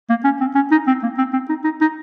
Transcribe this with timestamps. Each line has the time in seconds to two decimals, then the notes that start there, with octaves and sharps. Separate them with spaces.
0.09 A#3
0.24 C#4
0.41 C4
0.55 C#4
0.71 D#4
0.87 C4
1.03 A#3
1.18 C4
1.33 C4
1.49 D#4
1.64 D#4
1.81 D#4